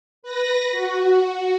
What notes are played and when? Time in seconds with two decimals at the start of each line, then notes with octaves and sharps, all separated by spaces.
0.23 B4 A#6
0.72 F#4